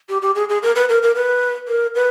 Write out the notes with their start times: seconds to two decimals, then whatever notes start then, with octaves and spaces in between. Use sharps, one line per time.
0.09 G4
0.22 G4
0.35 G#4
0.49 G#4
0.63 A#4
0.76 B4
0.89 A#4
1.03 A#4
1.15 B4
1.68 A#4
1.95 B4